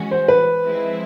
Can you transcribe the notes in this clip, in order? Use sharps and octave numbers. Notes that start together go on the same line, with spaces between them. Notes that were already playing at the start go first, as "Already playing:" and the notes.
Already playing: E3 G#3 C#4 F#4
C5
B4
F3 G#3 C4 E4